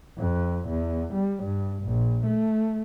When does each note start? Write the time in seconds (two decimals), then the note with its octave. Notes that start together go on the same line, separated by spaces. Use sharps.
0.18 F2
0.69 E2
1.14 G3
1.44 G2
1.83 A#1
2.26 A3